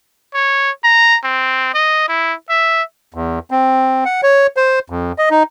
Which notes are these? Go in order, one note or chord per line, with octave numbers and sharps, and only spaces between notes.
C#5
A#5
C4
D#5
E4
E5
E2
C4
F#5
C#5
C5
F2
D#5
D#4